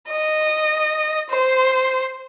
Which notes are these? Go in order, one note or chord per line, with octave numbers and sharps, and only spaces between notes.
D#5
C5